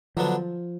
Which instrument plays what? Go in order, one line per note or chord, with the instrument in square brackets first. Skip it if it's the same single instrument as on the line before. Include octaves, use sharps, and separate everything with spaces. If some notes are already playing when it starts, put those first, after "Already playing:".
[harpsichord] D3 F#3 B3 D4 [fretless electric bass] F3